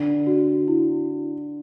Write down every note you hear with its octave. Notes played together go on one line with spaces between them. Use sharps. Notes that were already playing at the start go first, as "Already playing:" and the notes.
Already playing: D3
F#4
E4